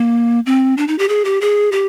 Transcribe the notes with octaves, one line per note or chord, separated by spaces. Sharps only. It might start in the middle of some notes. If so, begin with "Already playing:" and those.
Already playing: A#3
C4
D4
D#4
G4
G#4
G4
G#4
G4